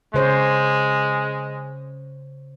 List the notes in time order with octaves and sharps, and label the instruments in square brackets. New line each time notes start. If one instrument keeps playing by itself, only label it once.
[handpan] C#3 C5 C#5 [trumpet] G#3